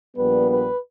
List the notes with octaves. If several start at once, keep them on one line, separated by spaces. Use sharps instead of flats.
A#1 A#2 G3 B3 B4
B4